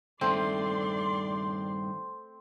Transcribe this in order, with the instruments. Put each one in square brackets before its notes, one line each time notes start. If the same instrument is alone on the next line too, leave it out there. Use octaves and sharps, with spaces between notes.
[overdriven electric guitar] G2 D#3 [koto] A3 [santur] C4 [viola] D5 C6